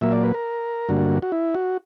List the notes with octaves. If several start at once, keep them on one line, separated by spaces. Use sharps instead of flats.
A#2 F#3 A#3 E5
D5
B4
A#4
G2 D3 A#3 F#4
F#4
E4
F#4